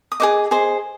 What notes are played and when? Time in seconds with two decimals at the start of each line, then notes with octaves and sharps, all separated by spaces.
0.12 D#6
0.20 G#4 C5 D#5 D6
0.51 G#4 C5 D#5